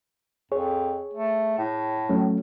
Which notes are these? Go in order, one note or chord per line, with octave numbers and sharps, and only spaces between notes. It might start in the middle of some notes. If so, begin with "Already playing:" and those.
F2 G#4 C#5
A3
A2
F#3 A3 C#4